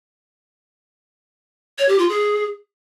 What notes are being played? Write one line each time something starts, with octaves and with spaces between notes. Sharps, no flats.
C#5
G4
F4
G#4